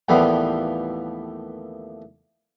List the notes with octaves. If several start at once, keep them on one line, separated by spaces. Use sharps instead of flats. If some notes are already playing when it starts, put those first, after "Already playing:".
D#2 A2 E3 F3 G3 B3